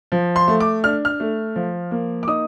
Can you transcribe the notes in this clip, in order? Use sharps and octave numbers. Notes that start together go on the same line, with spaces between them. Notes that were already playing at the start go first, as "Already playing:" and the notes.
F3
C6
A3
D6
D4 F6
F6
A3
F3
A#3
D6
D#4 D#6